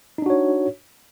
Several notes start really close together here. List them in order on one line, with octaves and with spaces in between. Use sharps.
D#4 D4 F#4 C#5